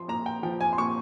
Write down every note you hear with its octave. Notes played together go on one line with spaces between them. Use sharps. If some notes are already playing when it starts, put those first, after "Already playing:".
Already playing: F3 C6
A#2 A#5
G5
F3 G5
G#5
C6
A#2 C#6